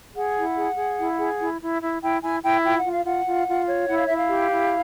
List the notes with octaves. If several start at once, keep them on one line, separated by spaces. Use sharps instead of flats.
G#4 F#5
E4
G#4
G#4
E4
G#4
E4
E4
E4
E4 G5
E4 G#5
E4 G5
F4 G5
F#5
F4
F5
F4 F#5
F4
F4
C#5
E4 F#5
F5
E4 E5
F5
G4
E4